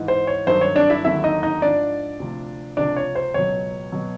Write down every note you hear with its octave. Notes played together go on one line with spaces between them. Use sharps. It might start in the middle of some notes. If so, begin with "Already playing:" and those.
Already playing: G#2 E3
C5
C#5
G2 D#3 F#3 C5
C#5
D4 D5
E4 E5
D#2 D3 F#3 E4 E5
D#4 D#5
D#4 D#5
G#2 F3 D4 D5
D2 C3 F3
C#2 C3 F3 D4 D5
C#5
C5
C#2 B2 F#3 C#5
B2 F#3